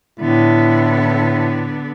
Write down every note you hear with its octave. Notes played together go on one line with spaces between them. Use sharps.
A2 D3 B3 E4